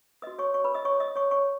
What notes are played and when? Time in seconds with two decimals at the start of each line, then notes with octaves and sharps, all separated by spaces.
0.22 F#4 B4 D#5 D#6
0.39 C#5 C#6
0.54 C#5 C#6
0.64 B4 B5
0.74 D#5 D#6
0.85 C#5 C#6
1.00 D#5 D#6
1.16 C#5 C#6
1.31 C#5 C#6